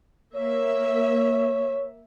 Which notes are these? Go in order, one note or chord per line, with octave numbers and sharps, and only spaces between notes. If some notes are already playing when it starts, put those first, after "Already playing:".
A#3 C#5 E5